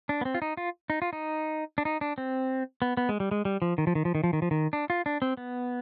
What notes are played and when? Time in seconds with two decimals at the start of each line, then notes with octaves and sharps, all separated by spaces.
0.09 D4
0.21 B3
0.25 C4
0.35 F4
0.42 D#4
0.57 F4
0.90 D#4
1.02 F4
1.13 D#4
1.78 D4
1.85 D#4
2.01 D4
2.18 C4
2.82 B3
2.97 B3
3.09 G#3
3.20 G3
3.31 G#3
3.45 G3
3.62 F3
3.78 D#3
3.87 F3
3.95 D#3
4.05 F3
4.15 D#3
4.24 F3
4.33 D#3
4.42 F3
4.51 D#3
4.73 D4
4.90 F4
5.06 D4
5.22 C4
5.37 B3